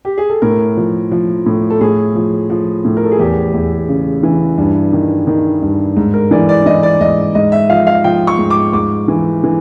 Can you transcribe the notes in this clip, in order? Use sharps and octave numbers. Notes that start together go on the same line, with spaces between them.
G4
G#4
A4
A2 A#4
F3
F3
A2
A4
A2 G#4
F3
F3
A2
A#4
A4
G#4
E2 G4
E2
C#3
E3
G2
D#3
D#3
G2
G#2
A#4
E3 D5
D5
E3 D#5
D5
G#2 D#5
G#2 D#5
E5
F3 F5
F5
F3 G5
C#6
G#2
D6
G#2 D6
E3
E3